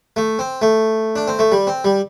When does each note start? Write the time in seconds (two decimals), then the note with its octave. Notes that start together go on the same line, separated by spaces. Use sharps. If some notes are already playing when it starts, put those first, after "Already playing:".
0.16 A3
0.39 C4
0.62 A3
1.16 D4
1.28 C4
1.39 A3
1.52 G3
1.67 C4
1.84 G3